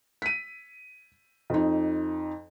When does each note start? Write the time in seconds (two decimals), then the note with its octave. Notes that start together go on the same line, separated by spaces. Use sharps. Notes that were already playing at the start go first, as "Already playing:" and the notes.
0.22 B6 D#7
1.50 F2 D#4